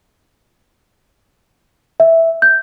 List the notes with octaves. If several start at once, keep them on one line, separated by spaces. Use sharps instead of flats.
E5
G6